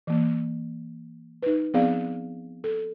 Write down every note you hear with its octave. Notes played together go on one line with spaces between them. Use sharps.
E3 A#3
D#4 B4
F3 B3 C4 G#4 D5 F5
A4